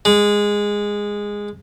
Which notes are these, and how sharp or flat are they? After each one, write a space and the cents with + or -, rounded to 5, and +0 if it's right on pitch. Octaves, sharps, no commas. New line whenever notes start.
G#3 -10